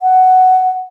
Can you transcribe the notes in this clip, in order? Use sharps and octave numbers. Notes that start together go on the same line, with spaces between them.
F#5